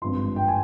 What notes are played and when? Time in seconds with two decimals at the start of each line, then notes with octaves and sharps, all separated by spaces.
0.02 G#1 G2 F3 C6
0.36 G5
0.48 G#5